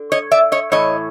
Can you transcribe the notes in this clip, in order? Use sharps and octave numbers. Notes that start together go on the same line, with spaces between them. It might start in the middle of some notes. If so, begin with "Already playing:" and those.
Already playing: D3
C#5 D#5
D5 E5
C#5 D#5
A2 E3 C#5 D#5